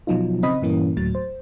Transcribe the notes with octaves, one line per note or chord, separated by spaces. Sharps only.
B2 F3 F#3 D#4 F4
C#3 C4 D#5 B5 D#6
G2 A#2 E3 A#3 C#4
D2 A2 F#3 A6
C5